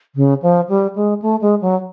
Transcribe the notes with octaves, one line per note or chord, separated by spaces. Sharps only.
C#3
F3
G3
G#3
A3
G#3
F#3